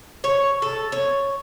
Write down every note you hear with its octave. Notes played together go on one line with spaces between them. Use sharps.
C#5
A4
C#5